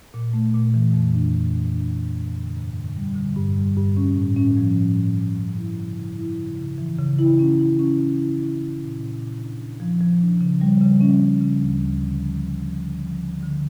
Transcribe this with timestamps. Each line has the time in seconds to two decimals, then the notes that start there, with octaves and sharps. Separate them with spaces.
0.14 A#2
0.33 A3
0.54 A#2
0.74 E3
0.94 F2
1.15 D4
1.35 D4
1.55 D4
1.75 D4
1.95 E3
2.16 F2
2.35 D3
2.56 G2
2.76 D3
2.96 G3
3.16 D3
3.36 G2
3.57 G3
3.77 G2
3.97 C#4
4.16 A2
4.36 C#4
4.57 F3
4.78 A2
4.97 A2
5.18 A2
5.37 C#4
5.58 E4
5.78 C#3
5.98 E4
6.18 E4
6.38 C#3
6.58 C#3
6.78 E3
6.98 C#3
7.18 E4
7.39 C#4
7.59 E4
7.79 C#4
7.99 C#4
8.19 E4
8.39 E4
8.60 E4
8.80 A#2
8.99 A#2
9.20 A#2
9.40 D4
9.60 D4
9.80 F3
10.00 F3
10.21 D4
10.41 C#3
10.61 G3
10.81 C#3
11.01 C#4
11.21 G3
11.41 C#3
11.61 D2
11.81 D2
12.02 D3
12.21 F3
12.42 D3
12.63 F3
12.82 D3
13.02 F3
13.23 D3
13.43 D3